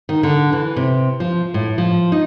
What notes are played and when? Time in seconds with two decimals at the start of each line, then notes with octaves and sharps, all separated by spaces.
0.09 D#3
0.23 D3
0.52 E3
0.76 C3
1.20 F3
1.54 A2
1.78 F3
2.12 D#4